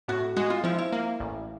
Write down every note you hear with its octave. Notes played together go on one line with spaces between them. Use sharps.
A2 F#4
G#3 F#4
F4
F3 E4
E4
A#3
A1